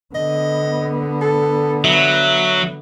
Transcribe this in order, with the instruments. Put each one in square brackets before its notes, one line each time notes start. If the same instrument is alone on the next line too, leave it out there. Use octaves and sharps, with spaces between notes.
[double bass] D3 B3 [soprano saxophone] D#5
[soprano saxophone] A4
[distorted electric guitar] F#3 [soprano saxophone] E5